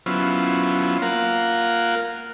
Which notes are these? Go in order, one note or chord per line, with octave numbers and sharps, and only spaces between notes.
F#3 B3 C#4 E4 F4 C5
A#3 F4 A#4 F5 F#5